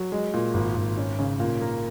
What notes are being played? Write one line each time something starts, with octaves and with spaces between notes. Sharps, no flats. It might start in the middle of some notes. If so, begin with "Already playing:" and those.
Already playing: F#3
G#3
A#2
G#1
G#1
C#4
C#3
A#2
A#3